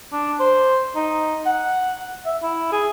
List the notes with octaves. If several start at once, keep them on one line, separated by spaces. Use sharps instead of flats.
D4
C5
D#4
F#5
E5
E4
G#4